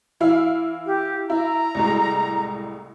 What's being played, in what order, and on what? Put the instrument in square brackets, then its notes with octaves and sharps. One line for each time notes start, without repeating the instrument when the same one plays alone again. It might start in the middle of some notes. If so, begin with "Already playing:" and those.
[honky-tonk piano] E3 E4 F5
[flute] G4
[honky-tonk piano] E4 [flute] A#5
[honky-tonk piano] C2 A2 G#3